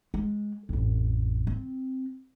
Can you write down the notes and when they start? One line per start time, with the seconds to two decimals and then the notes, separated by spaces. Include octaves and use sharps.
0.14 G#3
0.69 A1 F2
1.47 C4